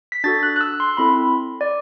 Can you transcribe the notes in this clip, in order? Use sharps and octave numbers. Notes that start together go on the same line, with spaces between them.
B6
D4 F#4 A4 A6
F#6
F#6
E6
C6
C4 E4 A4 B5
D5